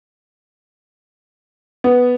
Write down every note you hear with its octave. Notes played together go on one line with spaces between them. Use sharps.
B3